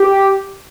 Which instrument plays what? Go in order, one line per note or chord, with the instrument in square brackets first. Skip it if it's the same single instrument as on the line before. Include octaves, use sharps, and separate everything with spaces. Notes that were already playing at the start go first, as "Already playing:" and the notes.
Already playing: [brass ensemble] G4